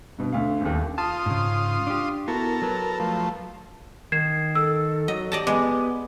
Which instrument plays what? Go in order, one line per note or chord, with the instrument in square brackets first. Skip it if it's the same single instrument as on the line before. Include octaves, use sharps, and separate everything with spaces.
[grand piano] G2 B2
D2 F5
D#1 A1 D#2
[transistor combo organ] F4 C6 D#6 [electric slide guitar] A5
[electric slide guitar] G#2 C#3
D4 G4
[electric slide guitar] B3 E4 F#4 [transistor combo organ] A4 A#4
[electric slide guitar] F#3 B4
[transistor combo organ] F3 A3
[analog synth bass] D#3 [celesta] G#6 C7 E7
[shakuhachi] A4 [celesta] E6
[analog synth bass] F#3 [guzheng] D#5
[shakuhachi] G4 [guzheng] D5 D#5 A5
[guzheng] G#3 [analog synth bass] B3 [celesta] D6